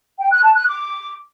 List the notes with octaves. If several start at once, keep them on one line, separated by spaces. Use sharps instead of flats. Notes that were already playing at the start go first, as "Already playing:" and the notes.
G5
F#6
A5
F#6
D6